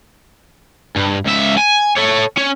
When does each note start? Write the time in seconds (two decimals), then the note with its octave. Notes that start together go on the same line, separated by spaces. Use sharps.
0.96 G2
1.26 C#2 E5
1.58 G#5
1.97 A4 C#5
2.38 C#4